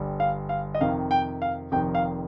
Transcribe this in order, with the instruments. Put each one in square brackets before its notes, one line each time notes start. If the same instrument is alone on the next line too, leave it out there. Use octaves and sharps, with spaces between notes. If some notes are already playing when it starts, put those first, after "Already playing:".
Already playing: [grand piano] G1 G2 G3
F5
F5
D#5
F2 C3 D#3 F5
G5
F5
F1 F2 C3 D#3 G5
F5